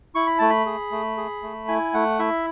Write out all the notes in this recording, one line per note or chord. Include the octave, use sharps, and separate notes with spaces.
E4 C#6
B5
A3 A5
B5
G#4
A3
G#4
A3
E4 G#5
A3 F#5
E4 E5